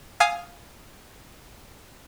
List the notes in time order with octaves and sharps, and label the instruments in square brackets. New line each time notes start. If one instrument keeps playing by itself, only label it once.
[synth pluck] F5 G#5 D#6 F6